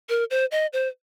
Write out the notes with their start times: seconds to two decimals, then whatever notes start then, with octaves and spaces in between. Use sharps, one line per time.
0.09 A#4
0.31 C5
0.51 D#5
0.73 C5